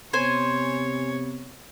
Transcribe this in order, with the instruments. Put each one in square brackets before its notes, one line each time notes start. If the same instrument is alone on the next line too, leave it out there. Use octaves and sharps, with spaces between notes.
[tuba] C3 [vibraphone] B3 [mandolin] C5 G#5 [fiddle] C#5